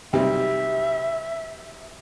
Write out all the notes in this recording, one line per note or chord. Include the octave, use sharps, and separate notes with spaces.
B1 C3 G3 E5